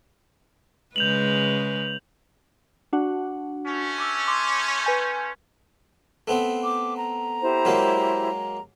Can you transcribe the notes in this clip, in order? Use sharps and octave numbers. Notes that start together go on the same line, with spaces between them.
C#3 G#3 B4 G6 F7 F#7
D4 F#4 F#5
A3 C#4
C#6 D6 E6
C6 D6
B4 G#5 G6
A3 B3 C4
D6
A#5
E4 G4 C5
F#3 G#3 A#3